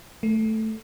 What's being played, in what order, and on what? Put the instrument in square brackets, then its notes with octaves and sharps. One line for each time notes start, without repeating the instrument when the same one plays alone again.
[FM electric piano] A3